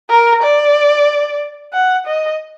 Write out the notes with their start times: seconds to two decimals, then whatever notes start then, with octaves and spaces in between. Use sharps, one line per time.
0.10 A#4
0.43 D5
1.73 F#5
2.06 D#5